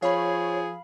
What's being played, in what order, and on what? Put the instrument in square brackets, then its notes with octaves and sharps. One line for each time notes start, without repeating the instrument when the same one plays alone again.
[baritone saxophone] F3 [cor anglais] G#4 [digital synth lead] C#5 [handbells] F5 B5